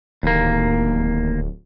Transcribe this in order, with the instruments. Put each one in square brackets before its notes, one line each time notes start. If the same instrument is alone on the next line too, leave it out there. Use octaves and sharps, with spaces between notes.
[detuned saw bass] D1 [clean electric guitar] D#2 A#3